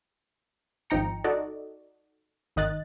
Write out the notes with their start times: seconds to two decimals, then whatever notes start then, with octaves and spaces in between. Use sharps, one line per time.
0.90 G#1 F3 D#4 G5 A#5 C#7
1.24 D#4 F#4 A4 D5 D#5
2.56 G#1 D#3 D#5 F#6 A6